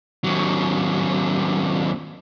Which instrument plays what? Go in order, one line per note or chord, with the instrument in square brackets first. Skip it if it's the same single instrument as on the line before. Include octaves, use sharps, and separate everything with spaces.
[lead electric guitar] D#2 F#3